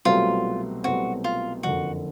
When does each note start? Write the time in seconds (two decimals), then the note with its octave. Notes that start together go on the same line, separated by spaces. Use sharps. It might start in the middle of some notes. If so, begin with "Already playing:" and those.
0.05 C2 B2 F#3 A3 C4 F4
0.84 C2 B2 F#3 A3 C4 F#4
1.24 F4
1.63 F#1 F2 D3 F#4